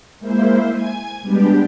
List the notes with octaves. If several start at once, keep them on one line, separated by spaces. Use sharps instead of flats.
G#3 A#3 E4 C5
G#5 G#6
B2 G3 G#3 B3 D4 G4